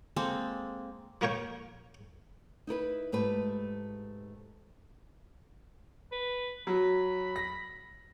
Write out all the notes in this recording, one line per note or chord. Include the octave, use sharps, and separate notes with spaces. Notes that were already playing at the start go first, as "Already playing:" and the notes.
G#3 A#3 C4 A4
F3 A#3 A#4 C#5 G5
D#4 E4 A#4 B4
G#2 A3 G4 B4
B4
F#3 B5
A#6